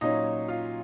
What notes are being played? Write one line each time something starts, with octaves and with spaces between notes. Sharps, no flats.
A#2 F#3 C#4 D#4 D#5
F4 F5